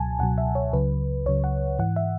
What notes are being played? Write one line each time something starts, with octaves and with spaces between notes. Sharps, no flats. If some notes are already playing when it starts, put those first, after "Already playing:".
Already playing: C#2 B2 F#3 G#5 A5
C#2 B2 F#3 F#5
E5
C#5
C#2 C#3 F#3 B4
C#2 C#3 F#3 C#5
F#5
G#2 E3 F#5
E5